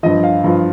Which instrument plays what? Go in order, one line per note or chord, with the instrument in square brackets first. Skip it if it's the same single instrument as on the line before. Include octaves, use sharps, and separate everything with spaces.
[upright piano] G2 F3 D#5
F5
G2 F3